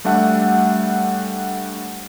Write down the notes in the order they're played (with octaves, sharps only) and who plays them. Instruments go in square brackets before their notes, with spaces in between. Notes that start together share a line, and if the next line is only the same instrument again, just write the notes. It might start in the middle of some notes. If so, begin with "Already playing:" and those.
[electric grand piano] G3 A3 D4 E5 F#5